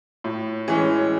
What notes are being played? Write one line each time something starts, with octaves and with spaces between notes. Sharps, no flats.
A2
E3 G#3 C#4